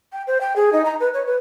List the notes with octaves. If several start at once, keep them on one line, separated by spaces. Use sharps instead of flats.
G5
C5
G5
G#4
D#4
A#5
B4
C#5
B4